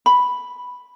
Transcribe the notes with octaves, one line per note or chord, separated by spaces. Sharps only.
B5